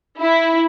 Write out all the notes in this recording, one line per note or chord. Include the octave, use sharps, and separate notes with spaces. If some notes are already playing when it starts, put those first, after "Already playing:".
E4